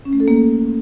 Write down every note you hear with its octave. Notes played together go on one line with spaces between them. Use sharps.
C#4
A3
A4
A#3